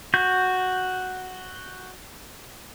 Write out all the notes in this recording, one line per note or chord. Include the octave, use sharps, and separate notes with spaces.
F#4 G6